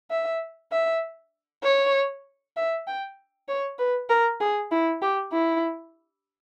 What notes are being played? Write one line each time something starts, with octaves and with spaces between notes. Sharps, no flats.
E5
E5
C#5
E5
G5
C#5
B4
A#4
G#4
E4
G4
E4